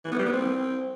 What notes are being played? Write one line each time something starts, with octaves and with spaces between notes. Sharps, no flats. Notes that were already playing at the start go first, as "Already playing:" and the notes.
E3
B3
G3
B3
C4